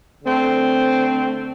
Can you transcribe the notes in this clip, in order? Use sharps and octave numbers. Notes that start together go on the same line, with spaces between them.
D3 A3 C4